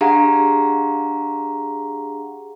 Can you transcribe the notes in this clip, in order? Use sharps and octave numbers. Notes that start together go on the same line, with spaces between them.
D4 G4 G#4 F5 F#5 A#5